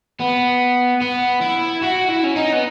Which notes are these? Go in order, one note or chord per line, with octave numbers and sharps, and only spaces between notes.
B3
B3
E4
F#4
E4
C#4
D#4
B3